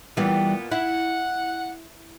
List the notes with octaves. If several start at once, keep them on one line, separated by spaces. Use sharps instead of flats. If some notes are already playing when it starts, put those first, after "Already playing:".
A#2 E3 G3 B3
E4 F#5